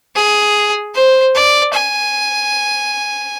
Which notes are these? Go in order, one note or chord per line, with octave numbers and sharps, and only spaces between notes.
G#4
C5
D5
G#5